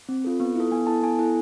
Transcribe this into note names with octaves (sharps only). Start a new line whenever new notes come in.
C4
F4 A4
B3
E4 A4
B3 G#5
E4 A4 A5
B3 G#5
E4 A4